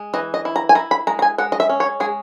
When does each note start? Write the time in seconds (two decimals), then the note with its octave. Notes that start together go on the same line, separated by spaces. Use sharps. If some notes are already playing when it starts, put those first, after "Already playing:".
Already playing: G#3
0.14 E3 D#5
0.34 D#5
0.45 E4
0.56 A#5
0.69 G#5
0.75 E4 A#5
0.91 B5
1.07 G#3 A#5
1.19 A#5
1.22 G#5
1.38 G#3 F#5
1.52 D#5
1.60 E5
1.69 C#4
1.80 C#5
2.00 G#3 G#4